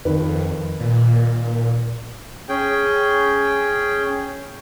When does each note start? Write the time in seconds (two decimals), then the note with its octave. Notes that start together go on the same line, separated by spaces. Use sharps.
0.05 F2 D#3 B4
0.80 A#2
2.49 C#4 G#4 G5